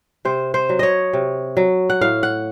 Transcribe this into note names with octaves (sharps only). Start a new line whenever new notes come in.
C3 C5
C5
F#3
C#5 D#5
C3
F#3
F#5
A2 F5
F#5